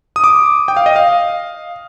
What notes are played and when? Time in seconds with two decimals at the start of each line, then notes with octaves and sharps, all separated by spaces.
0.16 D#6
0.24 D6
0.68 G5
0.77 F5
0.86 D#5
0.96 F5